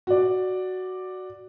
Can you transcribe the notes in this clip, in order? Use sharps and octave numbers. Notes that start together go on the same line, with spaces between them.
F#4 D5